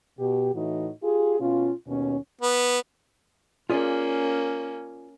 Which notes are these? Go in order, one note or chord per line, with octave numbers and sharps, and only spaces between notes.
B2 G4
A2 E3 D#4 F#4
F4 G4 G#4
B2 C#4 F4
D#2 B2 C#4
B3
A#3 C#4 F4 G#4 D5